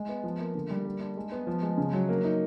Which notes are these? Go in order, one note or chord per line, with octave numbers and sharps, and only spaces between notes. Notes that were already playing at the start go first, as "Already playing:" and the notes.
Already playing: G#3
B3
F3
A#3
D3
G3
A#3
D4
G#3
B3
F3
G#3
C#3
F#3
A#3
D#4